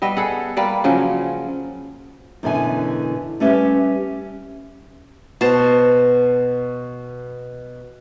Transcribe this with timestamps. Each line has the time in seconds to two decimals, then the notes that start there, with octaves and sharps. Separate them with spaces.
0.02 G3 B3 D#5 E5
0.17 G#4 A4 F#5
0.57 G3 A#3 B4 D5
0.84 C#3 F3 F#3 C#4
2.43 F#2 B2 D3 E3 E4 G#5
3.40 G3 A3 C#4 G4 B4 E5
5.41 B2 C5 A5